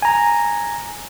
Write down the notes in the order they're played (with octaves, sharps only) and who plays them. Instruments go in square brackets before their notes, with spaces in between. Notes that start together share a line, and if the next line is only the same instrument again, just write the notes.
[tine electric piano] G#5 A#5